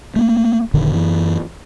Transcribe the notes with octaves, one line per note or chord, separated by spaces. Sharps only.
A3 A#3
F1 A#2 D3 D#3
F#2 E3